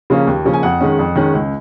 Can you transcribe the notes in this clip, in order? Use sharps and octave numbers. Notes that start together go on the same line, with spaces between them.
C#3 F3 A#3 C#4
D#2
C#3 F3 A#3 C#4
G#5
F2 F#5
D#3 G#3 C#4
F2
D#3 G#3 C#4
C#2